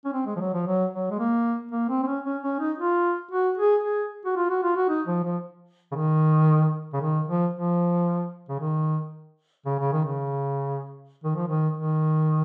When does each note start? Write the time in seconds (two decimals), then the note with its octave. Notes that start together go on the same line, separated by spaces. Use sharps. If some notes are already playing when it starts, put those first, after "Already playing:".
0.05 C#4
0.13 C4
0.26 G#3
0.36 F3
0.40 F#3
0.54 F3
0.66 F#3
0.93 F#3
1.11 G#3
1.19 A#3
1.72 A#3
1.89 C4
2.03 C4
2.07 C#4
2.25 C#4
2.43 C#4
2.60 D#4
2.78 F4
3.31 F#4
3.58 G#4
3.83 G#4
4.26 F#4
4.36 F4
4.50 F#4
4.63 F4
4.76 F#4
4.89 D#4
5.07 F3
5.24 F3
5.92 C#3
5.95 D#3
6.93 C#3
7.01 D#3
7.28 F3
7.53 F3
8.49 C#3
8.59 D#3
9.66 C#3
9.79 C#3
9.93 D#3
10.05 C#3
11.24 D#3
11.36 F3
11.47 D#3
11.77 D#3